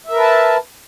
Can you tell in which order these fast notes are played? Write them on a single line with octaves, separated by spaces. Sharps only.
E5 A#4 B4 A5